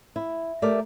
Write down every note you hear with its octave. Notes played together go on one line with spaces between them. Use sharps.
E4
A3 G4 A#4 D5